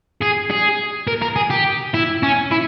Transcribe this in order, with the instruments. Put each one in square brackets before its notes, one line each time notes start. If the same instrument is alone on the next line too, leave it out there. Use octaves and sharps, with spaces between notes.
[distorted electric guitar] G#4
G#4
A#4
A#4
G#4
G4
E4
C#4
E4